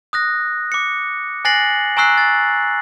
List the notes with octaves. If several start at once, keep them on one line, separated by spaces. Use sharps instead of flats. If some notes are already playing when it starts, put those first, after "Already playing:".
D#6 F#6 A#6
D6 C#7
G#5 F#6 A6 A#6 C7 F#7
G#5 A#5 C#6 E6 F#6 C7
A6